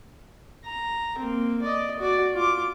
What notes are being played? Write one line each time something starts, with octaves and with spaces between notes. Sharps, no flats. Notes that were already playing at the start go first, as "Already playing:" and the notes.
A#5
A#3 C4
D5 D#5
F#4 D5
F4 D6